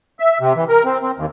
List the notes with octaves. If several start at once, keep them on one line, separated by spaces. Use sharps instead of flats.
E5
C3
E3
A#4
C4
C4
D#2